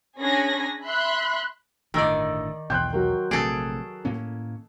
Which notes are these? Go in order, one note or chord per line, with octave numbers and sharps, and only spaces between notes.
C#4 D4 G#4 G#5 B5 A#6
E5 B5 C6 F#6
G1 A2 D3 D#3 D5 D#5 E6
B1 E2 B2 G5 C6 F#6 G6
F#3 F#4 A#4
A#1 C3 A3 G#4 A4 D7
A2 A#3 C#4